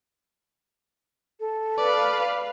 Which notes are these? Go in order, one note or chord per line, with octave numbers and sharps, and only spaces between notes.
A4
B4 D5 F5